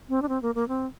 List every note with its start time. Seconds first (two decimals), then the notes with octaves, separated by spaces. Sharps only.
0.09 C4
0.22 D4
0.29 C4
0.42 A#3
0.55 A#3
0.68 C4